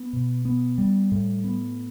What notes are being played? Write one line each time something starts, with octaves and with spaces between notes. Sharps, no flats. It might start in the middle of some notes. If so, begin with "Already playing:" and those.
Already playing: B3
B2
B3
G3
A2
B3